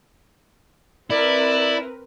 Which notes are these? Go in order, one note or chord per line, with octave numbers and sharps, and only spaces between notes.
C4 E4 A#4 B4 D5